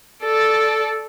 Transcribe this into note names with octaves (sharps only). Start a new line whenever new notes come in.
A4 D5